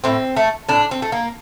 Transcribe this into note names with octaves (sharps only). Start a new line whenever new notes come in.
A2 C4
A3
A2 D4
C4
A3
A#3